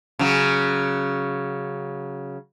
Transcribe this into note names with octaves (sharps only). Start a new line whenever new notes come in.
C#3 F#3